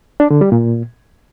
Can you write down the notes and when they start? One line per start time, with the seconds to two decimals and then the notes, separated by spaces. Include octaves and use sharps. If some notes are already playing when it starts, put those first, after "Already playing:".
0.20 D4
0.31 D3
0.41 G3
0.52 A#2